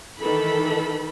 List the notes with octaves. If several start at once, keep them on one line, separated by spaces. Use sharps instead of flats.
D#3 E3 A4 B5